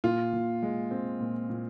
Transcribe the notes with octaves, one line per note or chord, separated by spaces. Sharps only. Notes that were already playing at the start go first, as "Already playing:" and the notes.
A#2 F4
A#2
G#3
C4
A#2
A#2